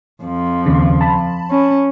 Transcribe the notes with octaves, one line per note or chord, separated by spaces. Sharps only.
F2 F3
D#2 C#3
A5 B5
C#4